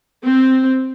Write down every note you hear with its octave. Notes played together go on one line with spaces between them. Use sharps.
C4